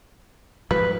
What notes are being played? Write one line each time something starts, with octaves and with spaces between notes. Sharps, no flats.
G#2 F3 G3 B4